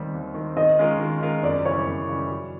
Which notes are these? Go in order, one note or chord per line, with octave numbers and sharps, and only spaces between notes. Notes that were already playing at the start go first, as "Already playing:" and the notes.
Already playing: D#2 D#3 G3 C4
D#2
D#3 G3 C4
D#3 D#5
G#3 C#4 F4 A#4
D#3
G#3 C#4 F4 A#4
F#2 D5
C#3 E3 G3 C#5
F#2
C#3 E3 G3
F#3